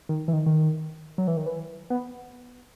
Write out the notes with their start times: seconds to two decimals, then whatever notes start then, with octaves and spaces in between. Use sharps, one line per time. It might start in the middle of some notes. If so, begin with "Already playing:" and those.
0.09 D#3
0.28 E3
0.33 D#3
0.46 D#3
1.18 F#3
1.27 E3
1.37 D#3
1.46 E3
1.90 B3